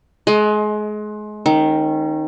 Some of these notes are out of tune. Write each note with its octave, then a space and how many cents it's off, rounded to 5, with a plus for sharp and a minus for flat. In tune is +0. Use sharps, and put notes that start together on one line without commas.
G#3 +30 D#5 +10
D#3 +0 C#4 -35